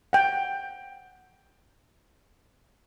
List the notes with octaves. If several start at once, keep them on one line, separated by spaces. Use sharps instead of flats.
F#5 G5